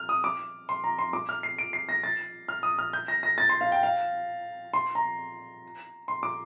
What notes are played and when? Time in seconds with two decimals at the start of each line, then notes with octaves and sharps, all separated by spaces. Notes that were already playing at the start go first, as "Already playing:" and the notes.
Already playing: F6
0.09 D#6
0.24 D6
0.69 C6
0.84 A#5
0.99 C6
1.13 D6
1.29 F6
1.43 C7
1.58 D7
1.73 C7
1.89 A#6
2.03 A6
2.48 F6
2.63 D#6
2.79 F6
2.93 G6
3.08 A#6
3.23 A#6
3.38 A6
3.49 C6
3.61 F5
3.72 G5
3.83 F5
4.73 C6
4.95 A#5
6.08 C6
6.23 D6